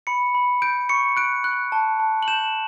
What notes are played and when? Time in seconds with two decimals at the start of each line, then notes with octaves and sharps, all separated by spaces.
0.07 B5 C#7
0.35 B5
0.62 G6 D7
0.89 C#6 C#7
1.17 F#6 D7
1.44 F#6
1.72 A5
2.00 A5
2.23 F#7
2.28 G6 E7